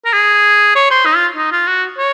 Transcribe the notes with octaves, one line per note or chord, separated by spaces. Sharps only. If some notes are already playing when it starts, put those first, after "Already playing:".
A#4
G#4
C#5
C5
D#4
F4
D#4
F4
F#4
C#5